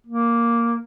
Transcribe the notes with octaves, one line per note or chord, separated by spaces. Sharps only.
A#3